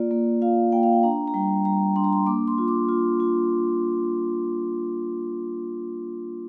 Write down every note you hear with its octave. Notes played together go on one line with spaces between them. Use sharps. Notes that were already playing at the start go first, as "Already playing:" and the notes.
Already playing: A#3 F4 D5
A#3
F4 F5
A#3 G5
F5
G5
D4 A#5
A#5
G3 G5
G3 A#5
D4 C6
A#5
C6
A#3 D6
C6
F4
D6
F4
F4